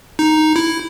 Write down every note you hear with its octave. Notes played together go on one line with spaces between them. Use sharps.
D#4
E4